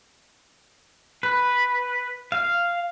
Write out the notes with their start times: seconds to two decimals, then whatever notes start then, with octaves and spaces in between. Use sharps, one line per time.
1.23 B4
2.32 F5